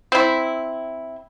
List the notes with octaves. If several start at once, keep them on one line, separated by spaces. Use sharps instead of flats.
C4 E4